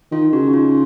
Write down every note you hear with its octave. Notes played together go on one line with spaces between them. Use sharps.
D#3 F4
C#3 F#4
D#4
F4